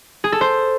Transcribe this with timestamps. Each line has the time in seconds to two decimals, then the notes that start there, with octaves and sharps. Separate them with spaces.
0.24 G#4
0.32 A4
0.41 C5